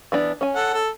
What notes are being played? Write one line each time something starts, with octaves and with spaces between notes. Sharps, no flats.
E3 B3 D4
C#4 G#5
A4 F#5
A4